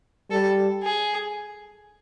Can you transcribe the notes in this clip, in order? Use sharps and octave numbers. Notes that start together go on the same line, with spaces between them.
G3 A4
G#4